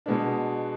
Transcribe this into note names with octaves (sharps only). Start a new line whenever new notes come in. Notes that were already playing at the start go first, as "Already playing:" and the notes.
B2 G#3 B3 D4